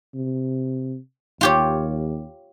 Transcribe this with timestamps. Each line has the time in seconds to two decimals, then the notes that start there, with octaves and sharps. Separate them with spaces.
0.14 C3
1.41 D#2 F4 G4 C#5